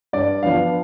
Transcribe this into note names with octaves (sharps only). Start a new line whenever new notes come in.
G2 D5
F3 B3 D4 F5